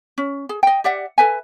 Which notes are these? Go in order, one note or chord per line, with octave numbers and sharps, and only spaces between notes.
C#4
G#4
D#5 G5
G4 D5 E5 F#5
A4 B4 E5 G#5